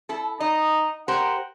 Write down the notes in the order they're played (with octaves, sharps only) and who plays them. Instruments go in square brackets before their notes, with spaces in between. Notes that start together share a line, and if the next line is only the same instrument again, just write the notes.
[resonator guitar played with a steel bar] E4 A4
[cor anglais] D#4 [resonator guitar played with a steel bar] D#5
[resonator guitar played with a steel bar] G4 A#4 C5 [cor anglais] F#5